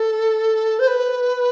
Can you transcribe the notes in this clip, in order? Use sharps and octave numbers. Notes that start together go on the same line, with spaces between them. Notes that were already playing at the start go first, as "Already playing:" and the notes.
Already playing: A4
C5
B4